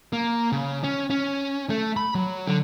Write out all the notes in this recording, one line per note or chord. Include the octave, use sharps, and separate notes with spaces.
A#3
C#3
C#4
C#4
A3
B5
F#3
D3